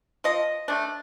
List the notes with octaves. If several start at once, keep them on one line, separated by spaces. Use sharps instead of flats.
F3 D#5
A3 D4